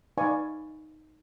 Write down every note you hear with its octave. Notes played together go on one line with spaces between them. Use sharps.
D#4 B4 D5 F5 G#5 C#6